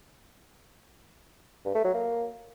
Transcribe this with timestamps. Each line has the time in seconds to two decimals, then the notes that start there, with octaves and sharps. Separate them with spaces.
1.65 G2
1.75 A3
1.84 F#3
1.94 A#3